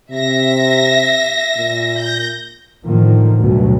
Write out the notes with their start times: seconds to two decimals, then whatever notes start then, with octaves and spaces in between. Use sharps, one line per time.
0.11 C3 E5 A#6
1.57 A#2
1.98 G6 A#6
2.85 A2 D3 D#3 F3 A#3
3.39 D2 G2 B2 F#3